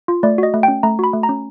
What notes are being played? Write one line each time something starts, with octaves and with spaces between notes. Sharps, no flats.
F4
A3 D5
F#4 D#5
A3
C#4 G5
A3 A#5
F#4 B5
A3
A#5
C#4